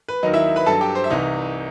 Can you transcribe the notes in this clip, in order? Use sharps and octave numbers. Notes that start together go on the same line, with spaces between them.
B4
D#2 D#3 F#3 D#4 D#5
E4 E5
B4 B5
G2 F#3 A4 A5
G4 G5
C5
E5
C2 C3 E3 D#4 D#5